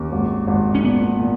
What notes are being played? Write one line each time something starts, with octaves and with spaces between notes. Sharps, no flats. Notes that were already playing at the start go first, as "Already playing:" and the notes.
Already playing: D#2 C#4
G#1
G#1
C#4
A#2 B3
A#2